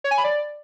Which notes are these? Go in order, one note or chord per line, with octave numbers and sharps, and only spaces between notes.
C#5
G#5
B5
D5